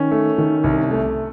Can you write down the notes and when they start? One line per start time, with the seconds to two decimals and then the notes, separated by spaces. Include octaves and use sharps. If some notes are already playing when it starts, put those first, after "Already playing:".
Already playing: D#3 C#4
0.11 A3
0.38 D#3
0.64 C2
0.91 A3